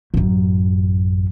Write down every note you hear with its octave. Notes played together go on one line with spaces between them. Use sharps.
A1 F#2